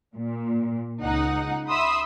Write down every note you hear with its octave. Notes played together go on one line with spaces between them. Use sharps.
A#2
C#2 D#4 F#5
E5 B5 C6 D#6 E6